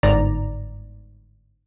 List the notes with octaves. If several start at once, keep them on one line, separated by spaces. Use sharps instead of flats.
G1 G#2 D5 A#5